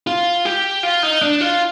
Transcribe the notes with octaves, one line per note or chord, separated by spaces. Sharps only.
F4
G4
F4
D#4
D4
F4